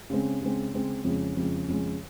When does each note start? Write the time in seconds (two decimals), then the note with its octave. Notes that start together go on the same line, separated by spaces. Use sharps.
0.10 C#3 G#3 C4
0.42 C#3 G#3 C4
0.74 C#3 G#3 C4
1.04 F2 C#3 G#3
1.37 F2 C#3 G#3
1.68 F2 C#3 G#3